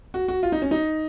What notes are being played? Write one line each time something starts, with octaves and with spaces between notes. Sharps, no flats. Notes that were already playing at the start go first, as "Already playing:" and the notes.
F#4
F#4
F4
D#4
C#4
D#4